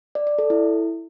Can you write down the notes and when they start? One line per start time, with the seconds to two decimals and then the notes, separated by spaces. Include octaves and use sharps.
0.15 D5
0.27 D5
0.39 A4
0.50 E4